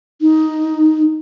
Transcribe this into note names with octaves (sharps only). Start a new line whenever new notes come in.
D#4